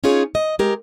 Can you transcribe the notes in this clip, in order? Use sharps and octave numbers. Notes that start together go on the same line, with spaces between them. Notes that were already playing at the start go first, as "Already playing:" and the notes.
C#4 D#4 F4 G#4 C#5
D#5
G#3 G4 A#4